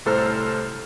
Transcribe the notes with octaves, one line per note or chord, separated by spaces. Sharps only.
C2 A2 A4 C5 A#5 F6